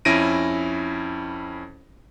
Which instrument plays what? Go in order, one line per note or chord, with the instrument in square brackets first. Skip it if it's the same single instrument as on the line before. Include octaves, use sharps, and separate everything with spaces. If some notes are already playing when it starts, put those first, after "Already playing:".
[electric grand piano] F2 C#4 E4 A#6 D7 D#7